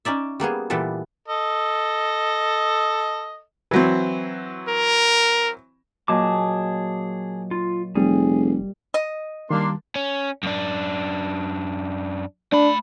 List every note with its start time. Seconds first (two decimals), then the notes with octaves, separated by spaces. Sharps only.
0.05 C#4 D#4 D5 E5
0.40 G3 A#3 B3 G#4
0.70 A#2 E3 G3 B3 A4
1.28 A4 D#5
3.71 E3 F#3 C4
4.69 A#4
6.08 A#2 F#3 G#4 D#5 A5 D6
7.51 F4
7.95 F1 G3 G#4
8.94 D#5
9.50 D#3 G3 A#3 D4 C6
9.96 C#4
10.43 F#2 D4
12.52 A3 D4 B5